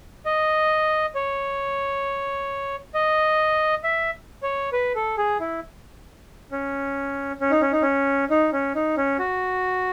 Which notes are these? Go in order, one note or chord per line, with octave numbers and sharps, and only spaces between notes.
D#5
C#5
D#5
E5
C#5
B4
A4
G#4
E4
C#4
C#4
D#4
C#4
D#4
C#4
D#4
C#4
D#4
C#4
F#4